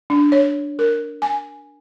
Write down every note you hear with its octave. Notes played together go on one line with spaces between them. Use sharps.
D4
C#5
A#4
G#5